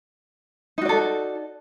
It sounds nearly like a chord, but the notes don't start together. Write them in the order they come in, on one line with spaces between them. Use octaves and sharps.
D#4 F#4 D5 A4